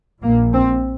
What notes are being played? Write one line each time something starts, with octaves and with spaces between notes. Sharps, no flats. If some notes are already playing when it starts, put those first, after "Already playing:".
A#1 A#2 A#3
C4